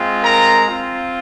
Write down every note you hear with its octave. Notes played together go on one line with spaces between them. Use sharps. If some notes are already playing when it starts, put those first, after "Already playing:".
Already playing: G#3 C4 F4
A#4 A#5
C4 F4